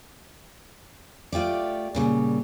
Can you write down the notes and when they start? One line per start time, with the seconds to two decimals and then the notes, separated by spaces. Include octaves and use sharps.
1.32 A3 F4 G4 D5
1.95 A#2 C#3 G3